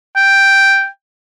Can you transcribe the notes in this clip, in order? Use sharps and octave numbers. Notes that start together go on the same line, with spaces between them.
G5